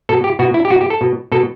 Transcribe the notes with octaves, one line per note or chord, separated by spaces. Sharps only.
B2 A4
G4
B2 F#4
E4
G4
B2 F#4
G4
A4
B2
B2 A4